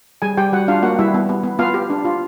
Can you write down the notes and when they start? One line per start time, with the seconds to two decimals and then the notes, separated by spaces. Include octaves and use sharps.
0.22 G3 G#4 G#5
0.37 G3 G4 G5
0.52 G3 F#4 F#5
0.68 D4 F4 F5
0.83 A#3 F#4 F#5
0.99 G3 E4 E5
1.14 B3
1.29 B3
1.44 B3
1.59 B3 F4 F5
1.74 G4
1.90 D4
2.05 F4